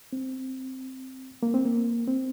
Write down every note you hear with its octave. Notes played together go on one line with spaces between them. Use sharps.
C4
A#3
C4
A#3
C4